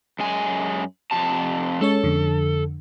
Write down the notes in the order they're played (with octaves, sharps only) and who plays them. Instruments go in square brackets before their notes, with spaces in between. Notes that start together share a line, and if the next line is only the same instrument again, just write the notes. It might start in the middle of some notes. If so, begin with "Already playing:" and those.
[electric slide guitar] F#2 G#3 G#5
F2 C3 A5
[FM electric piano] G#3 C#4 C#5 [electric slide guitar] A4
[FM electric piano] F2 D3